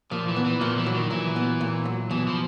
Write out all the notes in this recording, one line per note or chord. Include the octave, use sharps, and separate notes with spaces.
A#2 F3
E3
B3
E3
A#2 F3
E3
F#3
D#3
A#2 E3
B3
A#2
F#3
B2 E3
F3